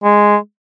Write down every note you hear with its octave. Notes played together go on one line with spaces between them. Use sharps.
G#3